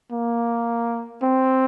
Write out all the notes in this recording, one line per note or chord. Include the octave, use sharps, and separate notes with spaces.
A#3
C4